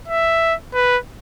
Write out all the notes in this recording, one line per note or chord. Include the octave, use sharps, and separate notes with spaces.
E5
B4